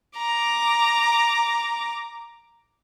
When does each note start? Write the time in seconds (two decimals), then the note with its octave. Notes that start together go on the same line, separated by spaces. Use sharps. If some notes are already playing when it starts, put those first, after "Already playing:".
0.17 A#5 D6